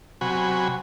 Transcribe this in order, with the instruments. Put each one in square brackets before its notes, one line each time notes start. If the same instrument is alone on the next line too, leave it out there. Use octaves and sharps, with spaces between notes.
[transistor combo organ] C3 F#3 F#4 G#5 B5